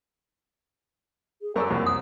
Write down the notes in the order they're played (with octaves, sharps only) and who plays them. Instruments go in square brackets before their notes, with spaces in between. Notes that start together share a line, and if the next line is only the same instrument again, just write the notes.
[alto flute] G#4
[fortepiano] F#2 A#4 C#6 [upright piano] A4 D5 E6 [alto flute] G#5
[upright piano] C2 F2 [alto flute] A#3
[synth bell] D#6